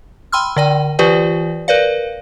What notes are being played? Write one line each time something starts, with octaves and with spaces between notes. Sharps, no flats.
G5 B5 C6 E6 F6
D3 D5 G5
E3 F4 G4 B4 D5 G5
A#4 B4 D5 F5